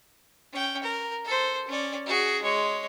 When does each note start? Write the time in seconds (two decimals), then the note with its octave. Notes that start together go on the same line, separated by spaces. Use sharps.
0.52 C#4 G5
0.83 A#4
1.25 A4 C5
1.68 C#4 D5
2.06 F#4 G#4
2.42 G#3 C#5